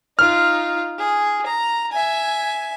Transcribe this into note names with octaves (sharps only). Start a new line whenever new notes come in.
D#4 F4 F6
G#4
A#5
E5 G#5